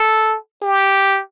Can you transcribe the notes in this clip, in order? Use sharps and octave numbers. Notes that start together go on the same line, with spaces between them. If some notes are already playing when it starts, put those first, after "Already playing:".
Already playing: A4
G4